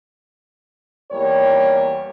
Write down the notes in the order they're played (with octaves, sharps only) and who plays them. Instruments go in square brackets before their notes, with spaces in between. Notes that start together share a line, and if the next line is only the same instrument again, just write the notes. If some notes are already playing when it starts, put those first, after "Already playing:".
[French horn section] E2 G3 A#3 C#5